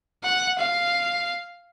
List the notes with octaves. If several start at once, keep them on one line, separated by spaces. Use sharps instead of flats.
F#5
F5